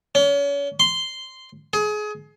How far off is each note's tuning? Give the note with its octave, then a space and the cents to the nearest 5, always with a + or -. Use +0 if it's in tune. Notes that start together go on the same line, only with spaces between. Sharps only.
C#4 +35
C6 -5
G#4 +25